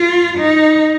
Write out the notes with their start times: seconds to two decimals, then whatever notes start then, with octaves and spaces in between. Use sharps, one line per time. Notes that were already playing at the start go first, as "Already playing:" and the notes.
Already playing: F4
0.38 D#4